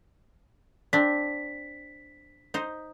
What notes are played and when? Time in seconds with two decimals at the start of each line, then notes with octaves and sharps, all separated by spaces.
0.93 C4 D4 B6
2.54 D#4 C5